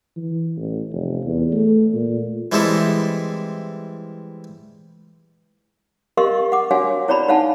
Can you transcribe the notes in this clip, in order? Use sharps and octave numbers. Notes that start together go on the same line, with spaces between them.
E3
A1
F1
E2
A3
A#2
E3 G3 G#3 C4 E4 A4
G4 A#4 D#5 F5 C6 C#6
F#5 D6
D4 F#4 C#5 F5 F#5 G#5
E4 C#5 D5 A#5 B5
D#4 C#5 F5 F#5 G#5 A5